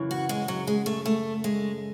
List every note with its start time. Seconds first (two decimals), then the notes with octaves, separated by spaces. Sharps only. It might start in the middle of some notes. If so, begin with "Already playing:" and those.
Already playing: F#2 C#3 E3
0.11 F#4
0.29 G#3
0.48 F#3
0.67 G#3
0.86 A3
1.06 A3
1.44 G#3